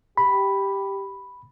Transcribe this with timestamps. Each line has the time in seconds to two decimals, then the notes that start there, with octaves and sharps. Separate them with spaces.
0.17 G4 B5